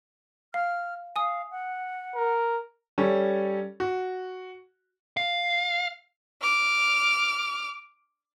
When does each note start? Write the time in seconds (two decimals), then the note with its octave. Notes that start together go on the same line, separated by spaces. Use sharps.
0.54 F5 F6
1.16 F5 G#5 D#6
1.51 F#5
2.15 A#4
2.98 G3 C#4 A4
3.80 F#4
5.17 F5
6.42 D6 F6